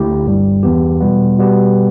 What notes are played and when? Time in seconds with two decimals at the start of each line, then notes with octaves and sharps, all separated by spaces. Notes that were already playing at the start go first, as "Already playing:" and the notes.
Already playing: D2 D3 A3 E4 G4
0.25 G1 G2 G3
0.63 E2 E3 B3 G4
1.00 B2 G3 B3
1.38 B2 G3 B3 G4